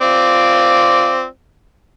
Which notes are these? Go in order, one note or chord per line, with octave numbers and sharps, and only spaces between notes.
C4 F4 D5